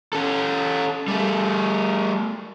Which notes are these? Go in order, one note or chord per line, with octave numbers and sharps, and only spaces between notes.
C#4 A4
G3 A3